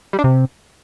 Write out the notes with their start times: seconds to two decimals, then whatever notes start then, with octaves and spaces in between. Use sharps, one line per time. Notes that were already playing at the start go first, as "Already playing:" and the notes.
0.13 G3
0.19 D4
0.24 C3